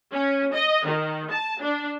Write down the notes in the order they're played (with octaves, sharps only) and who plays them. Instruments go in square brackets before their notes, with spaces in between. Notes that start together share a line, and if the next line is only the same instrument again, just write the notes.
[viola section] C#4
D#5
D#3
A5
D4